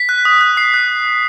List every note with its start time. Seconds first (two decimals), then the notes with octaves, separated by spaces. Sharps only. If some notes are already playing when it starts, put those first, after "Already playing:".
Already playing: B6
0.09 F#6
0.25 D#6
0.41 F#6
0.57 D#6 C7
0.74 F#6